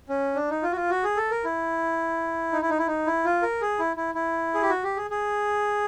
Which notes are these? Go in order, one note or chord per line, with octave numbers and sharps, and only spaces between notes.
C#4
D4
D#4
F4
F#4
F4
F#4
G#4
A4
A#4
E4
D#4
E4
D#4
E4
D#4
E4
F4
A#4
G#4
E4
E4
E4
G#4
G4
F#4
G4
G#4
G#4